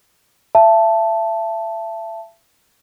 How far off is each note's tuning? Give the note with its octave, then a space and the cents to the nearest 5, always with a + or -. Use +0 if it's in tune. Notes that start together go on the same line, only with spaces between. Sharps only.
E5 +30 A5 +0